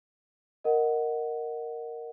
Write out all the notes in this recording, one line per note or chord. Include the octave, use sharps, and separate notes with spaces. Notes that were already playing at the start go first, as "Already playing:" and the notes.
A#4 D#5 F#5